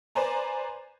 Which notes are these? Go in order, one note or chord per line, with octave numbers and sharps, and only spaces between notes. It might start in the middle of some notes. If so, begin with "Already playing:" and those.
B4 C5 D5 G#5 A#5